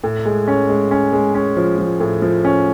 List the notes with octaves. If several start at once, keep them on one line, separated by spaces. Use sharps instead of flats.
A2
G#3
C#4
G#3
C#4
G#3
C#4
F3
F3
A2
F3
C#4